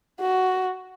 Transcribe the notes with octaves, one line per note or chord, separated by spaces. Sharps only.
F#4